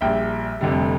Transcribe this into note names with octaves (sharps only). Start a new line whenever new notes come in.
A#1 A#2 G3 E5 G5
F1 F2 D3 G3